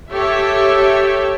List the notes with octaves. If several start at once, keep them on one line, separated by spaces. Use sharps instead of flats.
G4 A4 C#5 E5